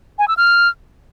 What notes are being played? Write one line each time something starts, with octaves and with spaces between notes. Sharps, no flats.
G#5
E6
F6